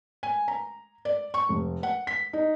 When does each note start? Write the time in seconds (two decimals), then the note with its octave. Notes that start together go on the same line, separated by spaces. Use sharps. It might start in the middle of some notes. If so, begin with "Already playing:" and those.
0.23 G#5
0.48 A#5
1.05 D5
1.34 C#6
1.49 F1
1.83 F#5
2.07 B6
2.33 D#4